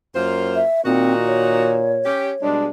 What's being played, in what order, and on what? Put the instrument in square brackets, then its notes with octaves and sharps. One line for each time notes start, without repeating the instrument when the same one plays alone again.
[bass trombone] F#2 [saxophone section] A#3 F4 C5
[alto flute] E5
[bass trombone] A#2 [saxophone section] D#3 D#4 F#4 [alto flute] C4
[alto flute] C#5
[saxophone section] C#4 G4
[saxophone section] B2 G3 G#3 [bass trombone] D4